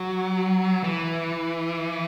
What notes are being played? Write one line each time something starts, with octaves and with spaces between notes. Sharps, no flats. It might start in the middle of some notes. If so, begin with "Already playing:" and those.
Already playing: F#3
E3